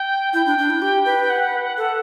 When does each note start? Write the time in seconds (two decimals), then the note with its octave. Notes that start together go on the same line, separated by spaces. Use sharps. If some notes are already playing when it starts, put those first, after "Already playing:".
Already playing: G5
0.33 E4 G5
0.46 D4
0.58 D4
0.70 E4
0.82 G4
1.05 B4
1.30 F#5
1.78 A4